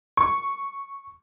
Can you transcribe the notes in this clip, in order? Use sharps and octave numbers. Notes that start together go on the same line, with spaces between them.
C#6